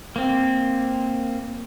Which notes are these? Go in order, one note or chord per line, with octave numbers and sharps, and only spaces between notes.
A#3 C4